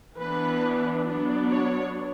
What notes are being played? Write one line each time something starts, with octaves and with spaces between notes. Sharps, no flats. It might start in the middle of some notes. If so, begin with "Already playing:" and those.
E3 B3 D4 B4
F#3 B3 D4
C#5